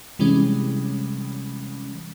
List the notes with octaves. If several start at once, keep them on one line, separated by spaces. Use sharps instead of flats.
C3 E3 G3 G#3 C#4